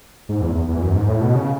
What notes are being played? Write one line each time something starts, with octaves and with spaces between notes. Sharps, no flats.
G#2
E2
E2
E2
F#2
G#2
A2
B2
C#3